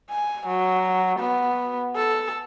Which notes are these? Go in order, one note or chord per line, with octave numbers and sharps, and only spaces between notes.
G#5
F#3
B3
A4